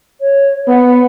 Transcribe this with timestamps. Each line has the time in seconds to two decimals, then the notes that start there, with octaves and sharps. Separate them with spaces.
0.20 C#5
0.68 B3 F#5